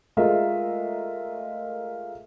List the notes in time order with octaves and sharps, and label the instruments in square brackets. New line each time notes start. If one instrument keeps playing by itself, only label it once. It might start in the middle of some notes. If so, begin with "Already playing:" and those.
[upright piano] G#3 A3 F4 A#4 D#5 E5